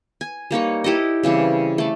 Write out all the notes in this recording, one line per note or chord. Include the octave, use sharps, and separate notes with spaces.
G#5
G3 A#3 D#4 C#5
E4 G4 A4 D#5
C#3 E3 G3 C4
A3 D5